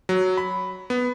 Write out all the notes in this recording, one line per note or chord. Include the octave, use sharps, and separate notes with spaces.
F#3
B5
B3